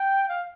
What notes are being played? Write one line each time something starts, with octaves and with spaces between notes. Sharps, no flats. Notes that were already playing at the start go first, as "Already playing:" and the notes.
Already playing: G5
F5